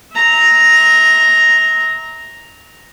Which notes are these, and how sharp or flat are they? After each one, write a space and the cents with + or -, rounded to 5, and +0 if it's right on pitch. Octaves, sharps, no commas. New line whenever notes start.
E5 -35 A#5 +0